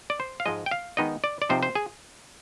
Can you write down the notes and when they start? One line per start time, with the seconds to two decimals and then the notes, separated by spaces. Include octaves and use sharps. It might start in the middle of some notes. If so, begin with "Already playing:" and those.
0.10 D5
0.20 C5
0.40 F5
0.46 G#2 F3 G#3 D#5
0.66 G5
0.71 F5
0.97 D#3 G#3 B3 D#4 D#5
1.24 D5
1.42 D5
1.49 C3 F3 C4 D#4 C5
1.63 C5
1.75 G#4